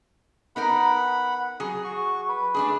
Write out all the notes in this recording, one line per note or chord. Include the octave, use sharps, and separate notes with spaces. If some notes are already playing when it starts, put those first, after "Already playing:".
B3 D#4 A#4 F#5 B5
F#3 G#4
F#4 C#6
B4
A3 D4 G#4